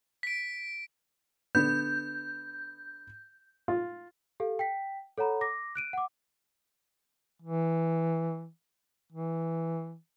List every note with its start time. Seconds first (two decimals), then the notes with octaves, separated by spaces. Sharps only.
0.23 B6 D7
1.55 D3 B3 G6
3.68 F4
4.40 G4 A4 F5
4.59 G5 B6
5.18 A4 C#5 F#5 A#5 B5
5.41 D6 A#6
5.75 F#6 D7 D#7
5.93 F#5 D6
7.42 E3
9.12 E3